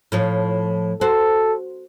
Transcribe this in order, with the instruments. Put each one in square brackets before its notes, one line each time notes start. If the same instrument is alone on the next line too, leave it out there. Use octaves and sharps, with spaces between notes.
[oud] A2 F3 C#5
[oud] F#4 C5 [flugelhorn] A4